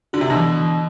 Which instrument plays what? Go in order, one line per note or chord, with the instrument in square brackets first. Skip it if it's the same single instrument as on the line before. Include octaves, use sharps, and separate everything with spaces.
[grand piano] D3 [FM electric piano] F#4
[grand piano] C3
B2 D3
[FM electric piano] E3
E3